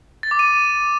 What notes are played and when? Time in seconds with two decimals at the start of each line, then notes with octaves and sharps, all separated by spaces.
0.23 A6
0.31 D6
0.39 D#7